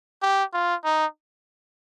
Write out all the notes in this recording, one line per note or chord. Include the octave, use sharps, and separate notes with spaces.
G4
F4
D#4